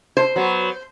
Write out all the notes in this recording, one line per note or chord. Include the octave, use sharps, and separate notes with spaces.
C5
F#3 B3